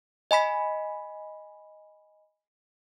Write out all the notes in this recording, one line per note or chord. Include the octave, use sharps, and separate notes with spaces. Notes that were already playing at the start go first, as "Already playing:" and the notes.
D#5 G#5 B5 B6